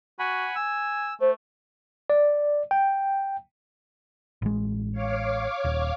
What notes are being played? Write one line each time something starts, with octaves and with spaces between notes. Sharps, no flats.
F#4 F#5 G#5 B5
G#5 E6
A3 C5
D5
G5
A1 G#3
C#5 F5 D6
D#1